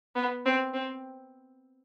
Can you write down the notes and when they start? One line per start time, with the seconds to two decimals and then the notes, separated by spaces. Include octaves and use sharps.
0.15 B3
0.45 C4
0.73 C4